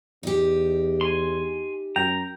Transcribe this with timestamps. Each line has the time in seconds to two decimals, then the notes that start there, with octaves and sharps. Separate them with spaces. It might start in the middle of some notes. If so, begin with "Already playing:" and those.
0.23 E2 D#4 G4
1.01 G#5 C6
1.96 F#2 G5 A#5